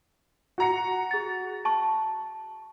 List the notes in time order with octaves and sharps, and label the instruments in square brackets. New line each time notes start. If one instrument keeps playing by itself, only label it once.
[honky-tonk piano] F#4 A#5 C#7
[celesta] G#4 A6
A5 C#6